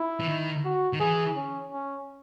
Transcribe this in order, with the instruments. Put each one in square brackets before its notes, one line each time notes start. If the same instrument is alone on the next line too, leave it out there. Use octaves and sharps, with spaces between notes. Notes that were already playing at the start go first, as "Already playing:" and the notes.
Already playing: [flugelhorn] E4
[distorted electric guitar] E3
D#3
[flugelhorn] F#4
[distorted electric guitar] D#3
[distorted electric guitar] E3 [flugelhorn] G#4
[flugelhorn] C#4
C#4